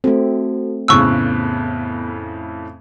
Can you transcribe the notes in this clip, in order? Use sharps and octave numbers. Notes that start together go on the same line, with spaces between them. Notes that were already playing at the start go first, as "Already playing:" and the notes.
A3 C4 F#4 A4
F2 A2 C#3 B3 C#6 E6 F#6